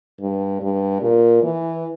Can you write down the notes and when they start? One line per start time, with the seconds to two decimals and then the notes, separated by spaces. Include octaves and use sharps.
0.20 G2
0.61 G2
1.02 A#2
1.43 E3